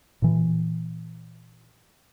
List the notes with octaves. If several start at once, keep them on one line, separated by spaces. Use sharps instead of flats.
A#2 E3